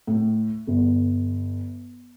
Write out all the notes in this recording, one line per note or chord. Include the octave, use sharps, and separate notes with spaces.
A2
G1